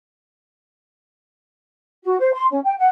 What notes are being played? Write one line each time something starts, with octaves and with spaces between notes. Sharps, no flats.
F#4
C5
C6
C#4
G5
F#5